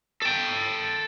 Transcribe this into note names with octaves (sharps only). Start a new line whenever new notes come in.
A4 G5